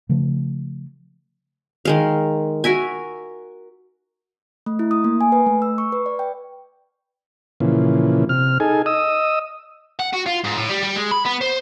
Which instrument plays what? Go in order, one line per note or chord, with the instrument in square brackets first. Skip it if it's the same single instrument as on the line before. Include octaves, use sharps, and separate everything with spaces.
[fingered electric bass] C#3 F3 A3
[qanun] D#3 G#3 F5
F#4 A#4 E5 G#5
[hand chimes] A3
E4
D#6
A#3
G#5
B4
A3
E6
C#6
B4
D5
G5
[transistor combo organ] A#2 C#3 E3 F3
C3 F6
D#4 G#4 A4 G#5
D#5 D#6 E6
[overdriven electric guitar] F#5
F#4
F4
G#2
A2
G3
G3
G#3
B5
B3
C5